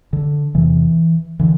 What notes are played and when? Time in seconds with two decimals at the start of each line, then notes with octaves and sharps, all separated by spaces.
0.13 D3
0.55 E2 C3 E3
1.39 D3 E3